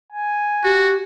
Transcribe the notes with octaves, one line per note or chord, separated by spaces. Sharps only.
G#5
F#4 G4